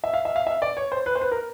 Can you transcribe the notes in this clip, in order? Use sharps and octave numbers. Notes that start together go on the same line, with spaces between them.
E5
F5
E5
F5
E5
D5
C#5
C5
B4
C5
B4
A#4